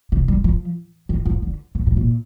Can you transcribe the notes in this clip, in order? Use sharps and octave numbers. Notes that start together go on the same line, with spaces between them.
C3
G3
F3
D#3
F3
D3
A#2
A2
A#2